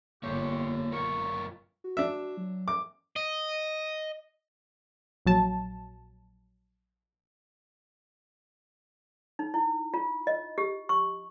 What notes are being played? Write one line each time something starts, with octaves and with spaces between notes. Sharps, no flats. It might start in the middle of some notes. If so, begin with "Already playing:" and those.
G1 A#3 G4 C#5 C6 C#6
F#2 F4 A#4 C#6
F#4
D4 E5
F#3
D6
D#5
A#1 F#3 A5
D#4
E4
F4
D#5
G4
C#6